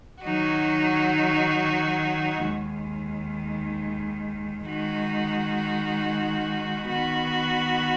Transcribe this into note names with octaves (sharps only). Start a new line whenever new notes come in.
D#3 F#3 D#4 F#4
D#2 D#3 G#3
D#3 G#3 D#4 F#4
D#3 B3 F#4